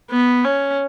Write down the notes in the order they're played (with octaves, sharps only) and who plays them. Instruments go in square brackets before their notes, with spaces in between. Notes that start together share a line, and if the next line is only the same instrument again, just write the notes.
[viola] B3
C#4